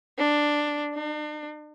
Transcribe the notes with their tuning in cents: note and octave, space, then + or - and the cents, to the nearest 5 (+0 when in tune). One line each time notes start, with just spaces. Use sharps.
D4 +5
D4 +45